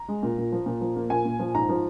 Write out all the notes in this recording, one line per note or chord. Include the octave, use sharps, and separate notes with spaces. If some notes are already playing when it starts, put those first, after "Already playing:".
Already playing: A#5
G#3
A#2
A#2
F3
A#2
F3
A#3
A#2 G#5
A#2
F3
G#2 A#5
F3